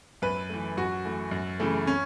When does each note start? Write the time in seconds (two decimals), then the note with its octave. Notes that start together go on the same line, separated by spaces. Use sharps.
0.22 F#2 B4
0.49 E3 A3
0.77 F#2 F#4
1.05 E3 A3
1.31 F#2
1.60 C#3 E3 A3
1.87 C#4